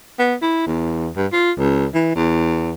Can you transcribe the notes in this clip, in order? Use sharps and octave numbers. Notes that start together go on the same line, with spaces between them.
B3
E4
E2
G2
F4
C#2
E3
E2